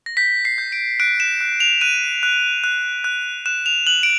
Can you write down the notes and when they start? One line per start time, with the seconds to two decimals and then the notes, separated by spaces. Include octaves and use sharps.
0.06 A#6
0.17 G6 B6
0.45 C7
0.58 G6
0.72 D7
1.00 F#6 D7
1.20 E7
1.41 F#6
1.60 F7
1.81 F#6 D#7
2.23 F#6
2.64 F#6
3.04 F#6
3.46 F#6 E7
3.66 F7
3.87 F#6 F#7
4.03 D7